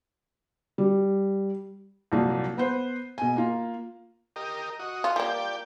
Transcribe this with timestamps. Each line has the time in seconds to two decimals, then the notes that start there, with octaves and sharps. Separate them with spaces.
0.78 G3
2.12 C2 A#2 F3 F#3
2.57 B3 B4 C5
3.18 B2 G#5
3.36 A#3 F4
4.36 G4 A#4 D#5
4.79 F#4 D#5
5.04 F4
5.16 F3 A#3 G4 D5 G5